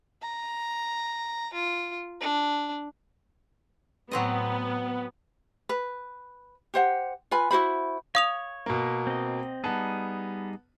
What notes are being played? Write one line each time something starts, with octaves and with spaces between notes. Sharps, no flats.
A#5
F4
D4
A2 F#3 B3 C4 D#5
B4
G4 C5 F#5
F4 B4 G#5 B5
E4 F#4 C5 B5
C#5 F5 D#6 F7
B2 A#3
C4 D#5
G3 B3 D#4 G#4 A5